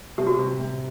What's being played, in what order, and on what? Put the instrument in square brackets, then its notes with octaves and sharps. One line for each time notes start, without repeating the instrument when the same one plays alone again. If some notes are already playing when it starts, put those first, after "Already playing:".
[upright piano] C3 [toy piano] G4
[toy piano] F#4
[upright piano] C3 [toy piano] G4
[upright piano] C3